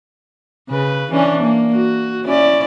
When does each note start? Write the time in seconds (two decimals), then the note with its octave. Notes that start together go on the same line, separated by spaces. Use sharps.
0.69 C#3 B4
1.11 E3 C#4 D4
1.43 A#3
1.74 F#4
2.25 C#4 E4 D5